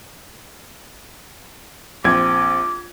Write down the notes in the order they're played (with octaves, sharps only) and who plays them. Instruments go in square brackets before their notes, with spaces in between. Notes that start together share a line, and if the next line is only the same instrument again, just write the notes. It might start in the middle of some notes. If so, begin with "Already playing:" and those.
[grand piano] A#1 C4 G#6 [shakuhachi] D6